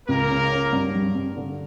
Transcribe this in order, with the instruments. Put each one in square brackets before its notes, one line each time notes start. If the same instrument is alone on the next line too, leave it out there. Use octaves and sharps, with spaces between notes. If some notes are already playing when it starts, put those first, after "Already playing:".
[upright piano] C#2 [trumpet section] A#3 A#4
[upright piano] C#3
C#4
G2
G3
G2
D3